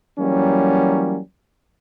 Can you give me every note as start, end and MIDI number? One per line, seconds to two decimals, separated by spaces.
0.19 1.19 52
0.19 1.19 54
0.19 1.19 55
0.19 1.19 58
0.19 1.19 61